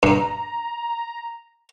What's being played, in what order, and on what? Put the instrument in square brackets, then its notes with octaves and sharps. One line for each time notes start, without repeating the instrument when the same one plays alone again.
[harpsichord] G2 [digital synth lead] A#5